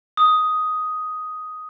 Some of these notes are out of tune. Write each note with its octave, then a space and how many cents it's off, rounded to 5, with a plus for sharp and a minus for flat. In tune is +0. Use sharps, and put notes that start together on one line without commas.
D#6 +5